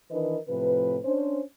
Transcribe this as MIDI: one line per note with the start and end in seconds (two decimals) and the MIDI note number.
0.11 0.37 51
0.11 0.37 52
0.11 0.37 62
0.11 0.37 70
0.11 0.37 71
0.11 0.37 75
0.48 0.98 45
0.48 0.98 48
0.48 0.98 53
0.48 0.98 71
1.04 1.40 61
1.04 1.40 62
1.04 1.40 72